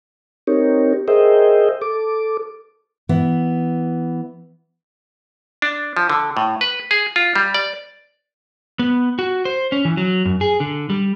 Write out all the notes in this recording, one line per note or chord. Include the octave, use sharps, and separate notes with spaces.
C4 D#4 G4 A#4 C#5
G#4 A#4 C5 D#5 E5 G5
A4 D6
E3 B3
D4
F3
D3
A2
B4
G#4
F4
G3
D5
B3
F#4
C5
C#4
E3
F#3
F#2
G#4
D3
G3